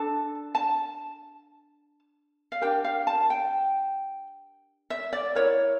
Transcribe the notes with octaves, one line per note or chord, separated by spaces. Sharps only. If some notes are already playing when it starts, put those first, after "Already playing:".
Already playing: D4 A4 A5
A5
F5
D4 G4 A#4 G5
F5
A5
G5
E5
D5
E4 A#4 C#5